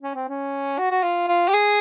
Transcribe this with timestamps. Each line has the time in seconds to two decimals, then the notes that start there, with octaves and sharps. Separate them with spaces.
0.03 C#4
0.15 C4
0.29 C#4
0.79 F#4
0.91 F#4
1.03 F4
1.28 F4
1.48 G4
1.54 G#4